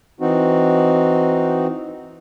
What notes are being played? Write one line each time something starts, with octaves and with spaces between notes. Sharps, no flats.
E3 C4 D#4 F#4